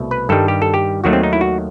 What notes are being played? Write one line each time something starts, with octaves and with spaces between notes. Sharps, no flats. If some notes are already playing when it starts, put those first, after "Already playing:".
Already playing: C2 B2 A3
B4
G2 D#3 G3 A4
G4
A4
G4
D#2 D#3 F#3 A3 F#4
C4
D#4
E4
F#4